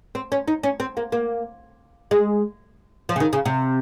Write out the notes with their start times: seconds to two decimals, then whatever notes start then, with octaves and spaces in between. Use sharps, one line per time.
0.15 C4
0.32 C#4
0.48 D#4
0.63 C#4
0.80 C4
0.97 A#3
1.12 A#3
2.11 G#3
3.09 F3
3.16 C#3
3.20 D#3
3.33 C#3
3.46 C3